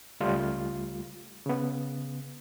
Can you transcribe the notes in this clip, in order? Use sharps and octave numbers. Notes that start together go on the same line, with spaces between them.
C#2 G3 A3 F4
C#3 B3